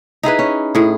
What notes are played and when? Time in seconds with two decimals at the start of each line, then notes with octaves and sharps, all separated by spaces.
0.23 D#4 E4 G#4 B4
0.39 C#4
0.75 A2 G#4